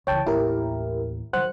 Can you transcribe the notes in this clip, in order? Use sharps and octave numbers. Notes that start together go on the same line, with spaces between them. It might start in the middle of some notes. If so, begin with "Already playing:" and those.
C#2 E3 C#5 G5 A5
A1 D#2 E4 G4 A#4
D#3 F#3 C5 F#5 F#6